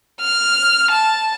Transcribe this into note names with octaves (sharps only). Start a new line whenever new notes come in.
F6
A5